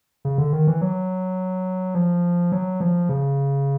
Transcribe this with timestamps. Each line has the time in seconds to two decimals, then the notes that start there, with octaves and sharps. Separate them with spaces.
0.25 C#3
0.38 D3
0.53 D#3
0.67 E3
0.81 F#3
1.94 F3
2.52 F#3
2.80 F3
3.09 C#3